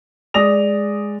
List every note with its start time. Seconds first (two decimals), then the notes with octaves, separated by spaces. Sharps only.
0.34 G#3 D5 D#6 A#6 F7